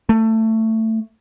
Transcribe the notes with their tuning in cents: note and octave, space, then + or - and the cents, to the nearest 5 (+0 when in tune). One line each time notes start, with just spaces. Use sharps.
A3 +20